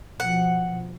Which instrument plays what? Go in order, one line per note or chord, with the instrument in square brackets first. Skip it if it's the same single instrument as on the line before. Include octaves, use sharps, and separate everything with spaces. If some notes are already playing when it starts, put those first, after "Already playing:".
[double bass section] B2 F3 [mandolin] F#5